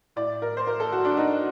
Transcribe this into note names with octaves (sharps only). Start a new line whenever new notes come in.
A2 D5
A#4
C5
A#4
A4
F#4
D4
D#4